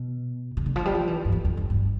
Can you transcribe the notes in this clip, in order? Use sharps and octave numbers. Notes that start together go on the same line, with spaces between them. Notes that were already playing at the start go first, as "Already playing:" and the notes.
Already playing: B2
C3
D3
F3
G3
F3
E3
G2
F2
F2
G2
G2